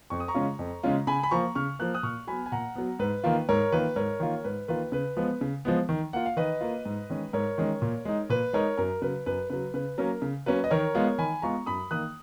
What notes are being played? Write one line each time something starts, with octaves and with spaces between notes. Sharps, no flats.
F2 C#6
D#6
A#5 C#6
C#3 G#3 C#4 F4
F2
C#3 G#3 C#4 F4
C#3 G#5 B5
B5
F3 A#3 A#5 C#6
C#3 C#6 F6
F3 A#3 F#6
D#6 F#6
A#2 C#6 F6
F#3 B3 G#5 B5
G#5
A#2 F#5 A#5
F#3 B3
G#2 B4
D#3 A#3 F4
G#2 A#4 C#5
D#3 A#3 F4 B4
G#2 A#4 C#5
D#3 A#3 F4
G#2 B4
D#3 A#3 F4 B4
C#3 B4
F3 G#3 B3 B4
C#3
F3 G#3 B3
D#3
A#3 F4 F#5
F5
D#3 B4 D#5
A#3 F4
G#2
D#3 G#3 C#4
G#2 A#4 C#5
D#3 G#3 C#4
A#2
G#3 D#4
A#2 B4
G#3 D#4 A#4 C#5
F#2 A#4
C#3 F#3 B4
F#2 B4
C#3 F#3 B4
C#3 B4
F#3 A#3 C#4 A#4
C#3
F#3 A#3 C#4 B4
D#5
D#3 A#4 C#5
G#3 B3 F4
D#3 G#5 B5
G#3 B3 F4 A#5 C#6
F#2 B5 D#6
D#3 A#3 D#6 F#6